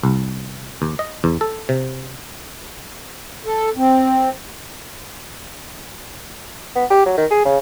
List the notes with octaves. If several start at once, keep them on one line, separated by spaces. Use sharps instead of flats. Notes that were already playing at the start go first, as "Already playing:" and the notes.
C2
D#2
D#5
E2
A4
C3
A4
C4
B3
G4
F#3
D#3
G#4
C#3